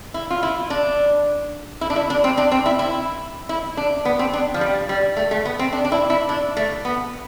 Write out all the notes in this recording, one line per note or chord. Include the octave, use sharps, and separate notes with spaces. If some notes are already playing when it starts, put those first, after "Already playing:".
E4
F4
E4
D4
E4
D4
E4
D4
C4
D4
C4
E4
E4
E4
D4
B3
C4
D4
F3
G3
G3
A3
A3
B3
C4
D4
D4
E4
E4
D4
A3
B3